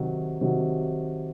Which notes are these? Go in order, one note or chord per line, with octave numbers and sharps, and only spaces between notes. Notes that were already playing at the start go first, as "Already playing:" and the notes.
Already playing: C3 D#3 F#3
C3 D#3 F#3